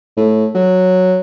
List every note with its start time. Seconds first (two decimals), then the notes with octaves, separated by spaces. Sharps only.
0.17 A2
0.55 F#3